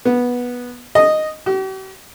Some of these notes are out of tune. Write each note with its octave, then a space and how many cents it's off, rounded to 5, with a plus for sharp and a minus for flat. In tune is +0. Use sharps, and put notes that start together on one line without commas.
B3 -10
D#5 -5
G4 -45